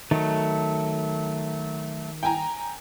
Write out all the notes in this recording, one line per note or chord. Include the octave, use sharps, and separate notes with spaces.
D#3 F#3 A3
G5 G#5 A#5